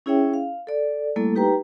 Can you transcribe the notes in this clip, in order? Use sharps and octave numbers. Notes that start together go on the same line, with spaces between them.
C#4 E4 G#4 C#5 E5 G5
F5
A4 D5
G3 A3 A#3 E4 A4
D#4 G4 B4 G5 A#5